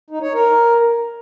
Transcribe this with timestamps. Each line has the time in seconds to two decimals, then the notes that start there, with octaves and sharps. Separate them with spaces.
0.10 D#4
0.22 C#5
0.34 A#4